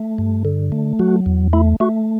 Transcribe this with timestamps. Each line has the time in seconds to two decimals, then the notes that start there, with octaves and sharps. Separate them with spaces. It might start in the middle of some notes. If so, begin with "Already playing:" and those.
Already playing: A3
0.18 G2
0.45 D3
0.72 A3
0.99 F#3 F#4
1.26 E2
1.53 A3 E4
1.80 A3 F#4